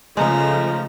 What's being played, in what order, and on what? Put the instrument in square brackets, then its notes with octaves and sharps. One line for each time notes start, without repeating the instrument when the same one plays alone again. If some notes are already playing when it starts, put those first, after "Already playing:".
[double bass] C#3 [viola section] F3 A3 [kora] G#3 D#4 [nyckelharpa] A#5